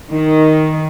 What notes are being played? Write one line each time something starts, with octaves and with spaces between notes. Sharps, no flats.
D#3